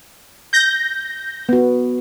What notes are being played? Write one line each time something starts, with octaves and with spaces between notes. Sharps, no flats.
G6 A#6
B3 F#4